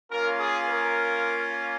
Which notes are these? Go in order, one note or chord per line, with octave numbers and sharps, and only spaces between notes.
A#3 C#4 F4 A#4
G#4
A#4